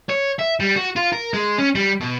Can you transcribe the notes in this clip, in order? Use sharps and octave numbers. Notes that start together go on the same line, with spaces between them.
C#5
E5
G3
F#4
F4
A#4
G#3
C#4
G3
B2